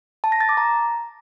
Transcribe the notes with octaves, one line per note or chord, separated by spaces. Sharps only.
A5
A#6
A6
D6
A#5